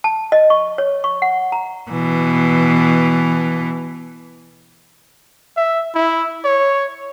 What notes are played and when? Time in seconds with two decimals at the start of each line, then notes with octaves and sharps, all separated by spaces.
0.04 A5
0.32 D#5
0.50 C#6
0.78 C#5
1.04 C#6
1.22 F#5
1.52 A#5
1.90 B2 E3
5.57 E5
5.95 E4
6.44 C#5